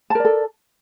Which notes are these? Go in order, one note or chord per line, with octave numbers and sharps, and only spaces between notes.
A4 A#4 D5 A5